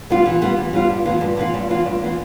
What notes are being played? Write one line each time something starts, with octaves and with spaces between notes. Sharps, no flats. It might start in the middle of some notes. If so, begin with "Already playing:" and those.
G3 B3 F4
E3
G3 B3 F4
E3
G3 B3 F4
G2
E3 B3 F4
G2
E3 B3 F4
G2
E3 B3 F4
G2
E3 B3 F4